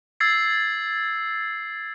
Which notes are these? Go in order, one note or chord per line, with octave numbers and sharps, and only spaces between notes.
E6 G#6 A6 C7